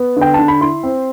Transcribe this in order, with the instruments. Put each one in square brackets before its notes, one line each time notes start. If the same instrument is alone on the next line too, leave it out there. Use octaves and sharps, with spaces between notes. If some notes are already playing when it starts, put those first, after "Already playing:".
Already playing: [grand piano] B3
D3 G5
D3 A5
B5
E4 C6
C4